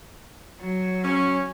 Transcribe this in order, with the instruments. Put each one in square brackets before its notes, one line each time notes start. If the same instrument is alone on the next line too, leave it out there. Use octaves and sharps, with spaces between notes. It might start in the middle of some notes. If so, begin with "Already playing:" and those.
[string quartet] F#3
[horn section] C#4